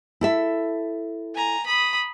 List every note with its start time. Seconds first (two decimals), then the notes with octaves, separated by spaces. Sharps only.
0.21 E4 A4 E5
1.35 G#5 A#5
1.67 B5 D#6